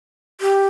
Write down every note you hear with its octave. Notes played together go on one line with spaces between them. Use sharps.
G4